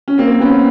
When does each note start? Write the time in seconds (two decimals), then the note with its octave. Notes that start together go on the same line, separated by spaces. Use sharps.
0.08 C#4
0.18 A#3 C4
0.40 B3 C#4